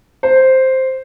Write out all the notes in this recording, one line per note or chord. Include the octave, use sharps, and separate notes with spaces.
C5